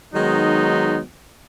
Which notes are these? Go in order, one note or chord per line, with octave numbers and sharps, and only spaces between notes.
D#3 F#3 G#3 B3 D#4